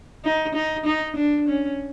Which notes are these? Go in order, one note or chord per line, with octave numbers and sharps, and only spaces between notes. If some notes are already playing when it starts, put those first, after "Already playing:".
D#4
D#4
D#4
D4
C#4